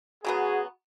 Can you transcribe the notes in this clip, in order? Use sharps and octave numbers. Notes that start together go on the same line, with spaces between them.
C#3 F#3 B3 F#4 G#4